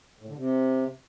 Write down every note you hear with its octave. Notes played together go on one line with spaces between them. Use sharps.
A2
D3
C3